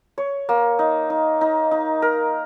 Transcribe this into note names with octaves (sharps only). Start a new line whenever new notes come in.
C#5
A#3
D#4
D#4
D#4
D#4
A#4